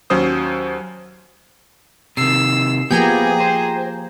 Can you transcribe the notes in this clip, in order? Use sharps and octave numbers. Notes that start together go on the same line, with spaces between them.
D#2 F#3 C#4 C5 D#6
C3 D#3 E6 C7
F3 A#3 B3 G4 G#4 G5 G#5 A#5
C5